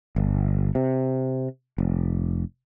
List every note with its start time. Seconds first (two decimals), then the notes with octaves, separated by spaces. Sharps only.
0.16 G1
0.75 C3
1.78 F1